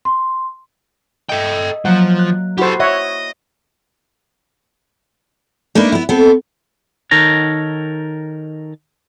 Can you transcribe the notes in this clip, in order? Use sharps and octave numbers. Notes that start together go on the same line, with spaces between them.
C6
A4 D#5 E5 G5
F3 F#3 A#3 F#5
F#6
E4 F#4 G4 A4 C5
C#5 D#5 E5 F#5
A3 A#3 D4 D#4 A#4 B4
B3 E4
B3 C4 A4
D#3 D#4 A4 A#4 C#5 A#5